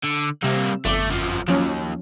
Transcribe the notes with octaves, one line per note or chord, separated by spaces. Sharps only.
D3
C3 G3 A#3 E6
G1 F2 A3 D6
F#2 F3
D#2 F3 F#3 C#4